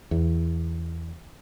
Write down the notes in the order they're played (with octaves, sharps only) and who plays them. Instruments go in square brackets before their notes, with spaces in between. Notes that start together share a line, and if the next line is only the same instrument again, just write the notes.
[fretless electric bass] E2